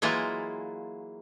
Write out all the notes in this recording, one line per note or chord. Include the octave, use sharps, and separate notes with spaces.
E3 F#3 G#3 A#3 E4 F4